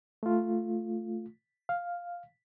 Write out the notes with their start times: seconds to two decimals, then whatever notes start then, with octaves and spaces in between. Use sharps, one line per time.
0.23 A3 F4
1.69 F5